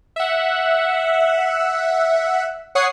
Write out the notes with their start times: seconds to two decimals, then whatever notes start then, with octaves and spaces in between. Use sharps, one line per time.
0.16 E5 F#5
2.75 C#5 F#5 C#6 D#6 C7